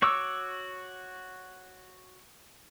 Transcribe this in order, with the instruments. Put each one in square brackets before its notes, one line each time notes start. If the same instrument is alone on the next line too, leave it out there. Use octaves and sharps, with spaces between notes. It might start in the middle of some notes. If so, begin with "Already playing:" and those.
[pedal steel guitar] F#4 C#5 C#6 D6 E6